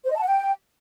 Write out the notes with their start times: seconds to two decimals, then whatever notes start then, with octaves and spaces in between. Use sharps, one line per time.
0.05 C5
0.10 D#5
0.16 A5
0.21 F#5
0.27 G5